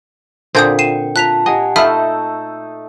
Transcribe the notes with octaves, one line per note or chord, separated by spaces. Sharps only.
A#2 D3 C4 F4 D#6 G6 G#6
G5 C7 D#7 E7
F4 A5 A#5 F#6 B6 F7
G4 D#5 F#5 G#5
A3 D#4 F4 E5 B5 D#6 E6 G6